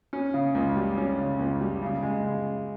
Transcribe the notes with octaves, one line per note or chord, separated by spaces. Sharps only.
C#4
C#3
C#2
G3
C#4
C#3
C#2
G3
C#3
G#3
C#3